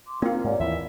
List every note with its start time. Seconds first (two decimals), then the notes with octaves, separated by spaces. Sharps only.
0.07 C6 D6
0.22 A#3 C4 D#4 F4
0.44 G#2 G4 C#5 D5
0.59 D#2 E3 E4 E5